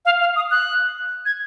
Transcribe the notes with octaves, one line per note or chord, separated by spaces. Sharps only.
F5
F5
D#6
F#6
G#6